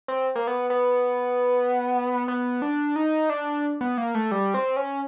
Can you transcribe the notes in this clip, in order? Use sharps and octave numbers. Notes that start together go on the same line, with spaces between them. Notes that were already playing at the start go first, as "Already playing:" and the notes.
C4
A#3
B3
B3
B3
D4
D#4
D4
B3
A#3
A3
G3
C4
C#4